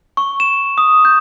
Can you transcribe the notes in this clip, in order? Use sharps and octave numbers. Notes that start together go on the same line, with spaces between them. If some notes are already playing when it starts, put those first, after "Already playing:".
C#6
E7
D#6
G6